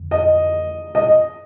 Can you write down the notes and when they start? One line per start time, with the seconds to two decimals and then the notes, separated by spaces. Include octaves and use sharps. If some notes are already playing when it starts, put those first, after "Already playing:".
Already playing: F2 D3
0.11 D#5
0.95 D#5